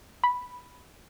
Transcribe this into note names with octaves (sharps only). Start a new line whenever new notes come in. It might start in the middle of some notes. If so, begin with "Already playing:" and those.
B5